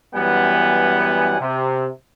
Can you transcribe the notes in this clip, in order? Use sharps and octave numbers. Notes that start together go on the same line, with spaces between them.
F#2 E3 G3 B3 F#5 G#5
C3